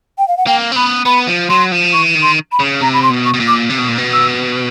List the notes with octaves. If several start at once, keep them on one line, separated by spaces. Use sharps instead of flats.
G5
F5
F#5
A#3 G5
C4
B3 B5
B3 B5
F3
F#3 C6
F3
E3 C#6
D#3
C6
B5
C#3
C3 A#5
B5
C6
B2
C#6
B2
A#2
D6
C3
B2
A#2
B2
E6